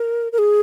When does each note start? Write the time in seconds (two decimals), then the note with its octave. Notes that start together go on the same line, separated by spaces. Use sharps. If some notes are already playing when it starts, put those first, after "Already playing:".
Already playing: A#4
0.32 A#4
0.38 G#4